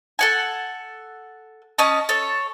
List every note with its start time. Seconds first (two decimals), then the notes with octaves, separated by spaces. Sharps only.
0.19 A4 F#5 G#5
1.78 C#4 D#5 A5
2.09 A4 C#5